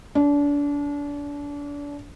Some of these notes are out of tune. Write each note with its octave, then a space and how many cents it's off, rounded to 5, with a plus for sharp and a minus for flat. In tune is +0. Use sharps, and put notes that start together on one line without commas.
D4 -30